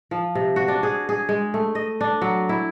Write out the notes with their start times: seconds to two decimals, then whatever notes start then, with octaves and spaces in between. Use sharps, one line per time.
0.11 F3
0.35 C3
0.56 F#4
0.68 D4
0.83 G#4
1.09 G#4
1.29 G#3
1.54 A3
1.75 D#5
2.01 D4
2.21 F#3
2.49 E4